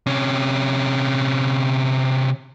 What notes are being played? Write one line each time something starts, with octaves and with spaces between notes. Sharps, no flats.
C3 C#4